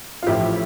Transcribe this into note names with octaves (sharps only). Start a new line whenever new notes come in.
F4
A1 A2 F3 E4 G4